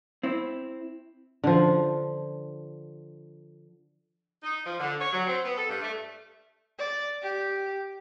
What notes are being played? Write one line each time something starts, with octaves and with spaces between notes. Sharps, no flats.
C4 E4
D3 F3
D#4
F3
D3
C#5
F#3
C4
B3
A4
G2
A3
D5
G4